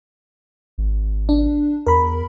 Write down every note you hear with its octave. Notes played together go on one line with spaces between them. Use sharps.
G#1
D4
E2 A#4 B5